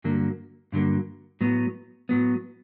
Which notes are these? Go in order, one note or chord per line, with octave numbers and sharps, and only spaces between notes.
G2 D3 F#3 A#3
G2 D3 F#3 A#3
A2 F#3 B3
A2 F#3 B3